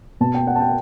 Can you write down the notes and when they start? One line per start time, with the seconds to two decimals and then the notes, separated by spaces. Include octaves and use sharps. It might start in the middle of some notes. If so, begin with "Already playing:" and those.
0.20 B2 A5
0.34 G5
0.47 F#5
0.56 A5
0.60 G5